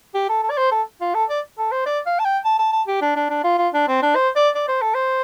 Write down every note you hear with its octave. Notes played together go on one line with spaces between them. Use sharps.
G4
A4
A4
D5
C5
A4
F4
A4
D5
A4
C5
D5
F5
A5
G5
A5
A5
A5
G4
D4
D4
D4
F4
F4
D4
C4
D4
C5
D5
D5
C5
A4
C5